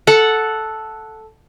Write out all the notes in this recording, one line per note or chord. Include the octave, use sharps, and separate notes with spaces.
A4 F#5